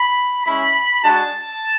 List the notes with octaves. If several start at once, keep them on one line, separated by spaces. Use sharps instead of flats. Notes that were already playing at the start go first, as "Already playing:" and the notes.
Already playing: B5
G#3 C#4 E4 B5
G#3 D4 F#4 A5